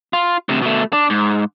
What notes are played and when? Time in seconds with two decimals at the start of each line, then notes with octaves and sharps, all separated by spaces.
0.13 F4
0.49 D2 C3
0.62 B2 A3
0.93 D4
1.10 G#2